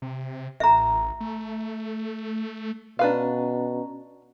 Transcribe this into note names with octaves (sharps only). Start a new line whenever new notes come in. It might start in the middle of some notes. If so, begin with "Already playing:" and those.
C3
A1 E5 A#5
A3
B2 C#4 D4 B4 F5 A#5